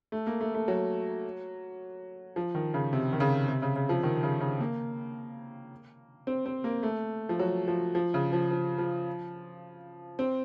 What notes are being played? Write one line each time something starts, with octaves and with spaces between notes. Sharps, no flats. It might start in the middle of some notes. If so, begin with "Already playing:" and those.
A3
A#3
A3
A3
F#3
F3
D#3
C#3
C3
D#3
C#3
C3
C#3
C#3
F3
D#3
C#3
C#3
A#3
C4
C4
A#3
A3
F3
F#3
F3
F3
C#3
F3
F3
F3
C4